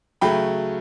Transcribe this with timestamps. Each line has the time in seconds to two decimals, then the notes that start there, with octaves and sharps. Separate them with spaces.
0.21 C#3 F#3 A3 G5 B5